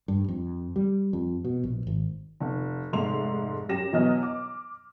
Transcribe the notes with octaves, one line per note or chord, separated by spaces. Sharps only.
G2
F2
G3
F2
B2
A#1
G#1
F1
F1 G#2 A3 E5 C6 F7
F#2 G4 A#6 E7
B2 E3 F#3 B3 D#5 F6
D6